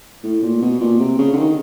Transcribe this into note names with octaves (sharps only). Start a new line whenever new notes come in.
A2
A#2
B2
A#2
C3
C#3
D3
D#3